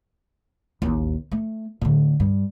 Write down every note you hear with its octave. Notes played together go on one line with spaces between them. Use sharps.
A1 D#2
A3
A2 D3
G2